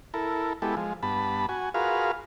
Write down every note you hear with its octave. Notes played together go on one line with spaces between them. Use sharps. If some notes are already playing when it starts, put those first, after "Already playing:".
E4 A4 A#4
G#3 B3 E4 G4 A4
F3 G#3
G2 B3 A5 B5
F#4 G#5
F4 F#4 G#4 A#4 B4 F5